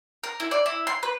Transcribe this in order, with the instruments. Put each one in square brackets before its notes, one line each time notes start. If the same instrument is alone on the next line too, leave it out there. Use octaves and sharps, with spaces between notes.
[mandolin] A#4
E4
D5
E4
C6
B4